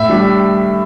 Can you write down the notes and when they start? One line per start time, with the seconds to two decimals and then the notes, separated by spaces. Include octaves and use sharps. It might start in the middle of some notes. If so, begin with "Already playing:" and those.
Already playing: A2 E5
0.09 G3 D4